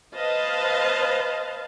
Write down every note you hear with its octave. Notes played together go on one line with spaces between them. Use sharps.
B4 C5 D#5 F5 A5